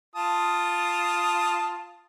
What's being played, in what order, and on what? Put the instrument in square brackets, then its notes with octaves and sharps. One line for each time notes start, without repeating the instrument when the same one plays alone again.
[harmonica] F4 A5 D#6